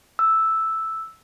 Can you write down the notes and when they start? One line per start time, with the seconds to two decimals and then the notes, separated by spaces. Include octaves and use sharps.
0.19 E6